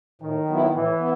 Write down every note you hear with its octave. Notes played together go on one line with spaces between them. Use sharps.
A2 D#3
F#3 B3 E4
A2 E3
B3